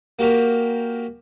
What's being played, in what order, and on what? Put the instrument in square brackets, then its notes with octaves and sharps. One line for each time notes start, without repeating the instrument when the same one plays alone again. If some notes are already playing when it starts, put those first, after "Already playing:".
[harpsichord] A#3 F#4 G4 A#4